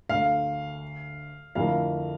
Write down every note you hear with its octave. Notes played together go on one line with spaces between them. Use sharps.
D2 D3 A3 F5
F2 D3 A3 E4 A#4 F5